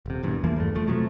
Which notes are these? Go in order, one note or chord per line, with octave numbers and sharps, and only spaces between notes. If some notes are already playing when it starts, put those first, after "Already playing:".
D#1 C3
E1 E2 G2
E2 E3 F3 A#3
E2 G2 A3
F1 F3 A3
C3 F3 F#3 A3